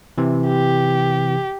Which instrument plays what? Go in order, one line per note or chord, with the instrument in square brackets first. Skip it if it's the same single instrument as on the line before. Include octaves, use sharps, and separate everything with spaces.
[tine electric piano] C3 E3
[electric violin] G4